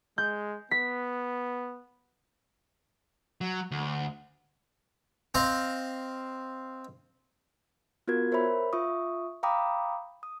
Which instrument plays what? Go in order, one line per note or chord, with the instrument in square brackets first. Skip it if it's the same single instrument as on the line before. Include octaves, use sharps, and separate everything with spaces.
[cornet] G#3 [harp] G6
[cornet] B3 [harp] B6
[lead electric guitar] F#3
D2
[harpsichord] C4 D#5 F5
[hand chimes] B3 F4 F#4 A#4 G#6
A#4 C5 C#5 E5 B5
F4 E5 C#6 D#6
F5 G5 A#5 B5 D6 D#6
D#6